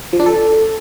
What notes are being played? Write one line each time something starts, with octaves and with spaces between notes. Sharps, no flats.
F3
D4
A4